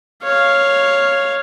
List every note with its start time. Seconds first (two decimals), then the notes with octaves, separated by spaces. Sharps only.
0.23 C#5 F5